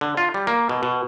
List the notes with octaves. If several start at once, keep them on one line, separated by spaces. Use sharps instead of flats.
D3
F4
G3
A#3
B2
B2